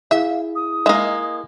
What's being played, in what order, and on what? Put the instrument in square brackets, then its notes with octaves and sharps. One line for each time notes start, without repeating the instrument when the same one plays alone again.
[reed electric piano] E4 G#4 [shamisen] E5 [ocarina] F5
[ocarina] D#6
[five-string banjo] G#3 A#3 [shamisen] D#5 E5